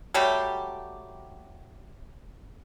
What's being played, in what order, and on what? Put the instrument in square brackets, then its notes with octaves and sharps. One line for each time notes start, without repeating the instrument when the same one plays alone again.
[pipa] F#3 G3 A3 G4